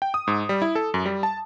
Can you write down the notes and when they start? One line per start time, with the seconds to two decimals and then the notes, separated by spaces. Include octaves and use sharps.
0.02 G5
0.14 D#6
0.27 G#2
0.49 G3
0.62 E4
0.75 A4
0.94 F#2
1.05 G3
1.23 A5